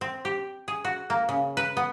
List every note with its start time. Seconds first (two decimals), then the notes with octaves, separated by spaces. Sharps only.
0.01 C4
0.25 G4
0.68 G#4
0.85 F#4
1.10 A#3
1.29 C#3
1.57 B4
1.77 B3